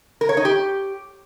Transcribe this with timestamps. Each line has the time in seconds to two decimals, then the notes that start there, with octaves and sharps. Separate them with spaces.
0.21 A#4
0.29 C#5
0.37 D#4
0.45 G4